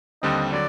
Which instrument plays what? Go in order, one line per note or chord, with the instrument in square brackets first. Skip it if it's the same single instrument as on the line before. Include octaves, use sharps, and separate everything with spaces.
[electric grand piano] D#2 D3 G3 C4 [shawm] D#5
[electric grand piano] D3 F#3 [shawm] D5